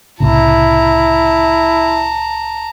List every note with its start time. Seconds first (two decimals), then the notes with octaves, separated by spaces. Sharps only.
0.20 C2 A2 C#3 E4 A5 A#5